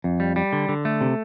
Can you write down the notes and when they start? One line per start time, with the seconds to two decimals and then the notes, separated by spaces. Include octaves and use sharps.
0.04 F2
0.20 G3
0.36 G3
0.53 D3
0.69 D3
0.85 A3
1.01 C3